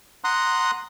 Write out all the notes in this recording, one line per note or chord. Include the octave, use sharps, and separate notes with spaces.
F#5 A#5 C6 D#6 F#6